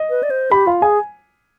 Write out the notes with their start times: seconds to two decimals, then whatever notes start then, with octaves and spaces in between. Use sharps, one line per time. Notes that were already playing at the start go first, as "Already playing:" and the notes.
Already playing: D#5
0.10 B4
0.23 D5
0.30 C5
0.51 G4 B5
0.67 F4 F5
0.82 G#4 G#5